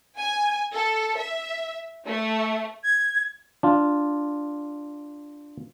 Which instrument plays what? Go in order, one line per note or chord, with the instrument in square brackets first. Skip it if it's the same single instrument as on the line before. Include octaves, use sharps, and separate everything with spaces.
[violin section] G#5
A4
E5
A3
[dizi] G#6
[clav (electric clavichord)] D4 F4